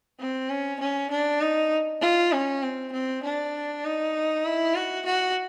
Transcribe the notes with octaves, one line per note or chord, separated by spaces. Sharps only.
C4
C#4
C#4
D4
D#4
F4
C#4
C4
C4
D4
D#4
E4
F#4
F#4